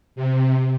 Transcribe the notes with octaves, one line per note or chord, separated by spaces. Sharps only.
C3